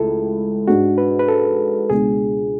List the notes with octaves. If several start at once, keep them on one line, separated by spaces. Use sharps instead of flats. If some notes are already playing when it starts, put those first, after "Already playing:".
Already playing: C#2 A3 E4 A4
G#2 G#3 D4 F#4
B4
B4
A4
C#2 B2 G#3 D4 G#4